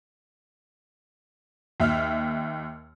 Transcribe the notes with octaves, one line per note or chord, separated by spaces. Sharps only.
D#2 E5 F6